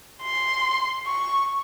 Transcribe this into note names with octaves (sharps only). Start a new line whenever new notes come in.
C6
C#6